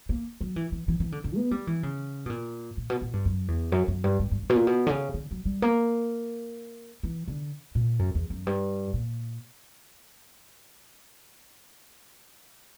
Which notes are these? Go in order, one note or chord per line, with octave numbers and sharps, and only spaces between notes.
A#3
F#3
E3
E3
E3
E3
D3
D3
B3
G3
E3
C#3
B2
A#2
A#2
B2
A#2
G2
F#2
E2
F#2
F#2
G2
G2
G2
G2
B2
A#2
B2
D3
C#3
D3
F#3
G3
A#3
E3
D3
A#2
F#2
E2
F#2
G2
A#2